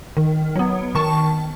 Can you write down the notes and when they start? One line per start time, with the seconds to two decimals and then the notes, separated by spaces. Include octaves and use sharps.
0.17 D#3
0.56 F#3 B3
0.95 D#3 A5 C#6